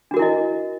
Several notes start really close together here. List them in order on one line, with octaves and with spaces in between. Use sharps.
D4 F#4 A#4 E4 D#5